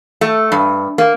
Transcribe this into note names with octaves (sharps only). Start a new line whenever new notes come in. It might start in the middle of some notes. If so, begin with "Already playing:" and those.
A3
G2
A#3